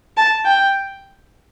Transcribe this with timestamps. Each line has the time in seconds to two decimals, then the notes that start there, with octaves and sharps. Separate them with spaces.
0.17 A5
0.45 G5